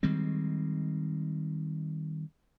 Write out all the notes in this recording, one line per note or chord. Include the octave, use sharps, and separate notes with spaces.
D#3 G3 G#3 C4